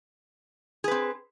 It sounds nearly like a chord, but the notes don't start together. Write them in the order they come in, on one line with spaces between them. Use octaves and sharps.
G#4 B4 C4